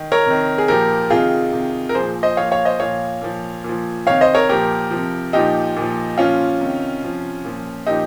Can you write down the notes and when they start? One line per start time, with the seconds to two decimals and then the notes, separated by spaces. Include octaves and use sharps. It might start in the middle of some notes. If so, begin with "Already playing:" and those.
Already playing: D#3
0.12 A#4 C#5
0.26 C3 D#3
0.58 G#4
0.68 A#2 F3 G4 A#4
1.10 C3 D#3 F4 G#4
1.53 C3 D#3
1.89 A#4
1.95 A#2 F3 G#4 C5
2.23 C5 D#5
2.37 A#2 F3 C#5 F5
2.51 C#5 F5
2.65 C5 D#5
2.79 A#2 F3 C#5 F5
3.22 A#2 F3
3.64 A#2 F3
4.07 C3 D#3 C#5 F5
4.21 C5 D#5
4.35 A#4 C#5
4.49 A#2 F3 G4 A#4
4.91 C3 F3
5.33 A#2 F3 D#4 G4
5.76 A#2 F3
6.18 A#2 F3 C#4 F4
6.60 C3 D#3
7.03 C3 F3
7.44 A#2 F3
7.87 A#2 F3 D#4 G4